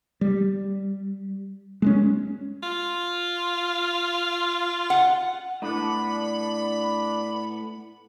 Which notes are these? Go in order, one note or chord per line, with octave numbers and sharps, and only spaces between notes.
G3
G#3 A3 C#4
F4
F#5
A2 B3 D4 B5